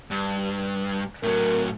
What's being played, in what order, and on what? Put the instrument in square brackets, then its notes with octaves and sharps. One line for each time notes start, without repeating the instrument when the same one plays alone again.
[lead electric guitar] G2
[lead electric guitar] A2 F#3 [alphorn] A#4